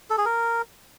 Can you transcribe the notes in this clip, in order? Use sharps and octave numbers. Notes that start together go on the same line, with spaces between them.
A4
G#4
A#4